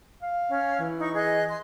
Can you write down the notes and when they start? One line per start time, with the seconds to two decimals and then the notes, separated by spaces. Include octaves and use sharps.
0.22 F5
0.49 C#4
0.79 E3
0.99 D#4 C#6
1.15 G#4 D#5 F#6
1.48 C6